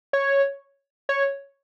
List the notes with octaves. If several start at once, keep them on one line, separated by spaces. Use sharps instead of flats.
C#5
C#5